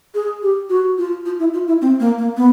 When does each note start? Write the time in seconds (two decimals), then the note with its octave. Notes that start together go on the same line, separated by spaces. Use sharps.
0.15 G#4
0.43 G4
0.70 F#4
0.98 F4
1.26 F4
1.40 E4
1.54 F4
1.68 E4
1.82 C4
2.00 A#3
2.18 A#3
2.37 B3